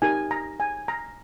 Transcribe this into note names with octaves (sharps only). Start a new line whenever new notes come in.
D#4 G4 A#4 G#5
A#5
G#5
A#5